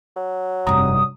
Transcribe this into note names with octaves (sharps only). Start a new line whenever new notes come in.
F#3
F1 G2 C3 A#5 D#6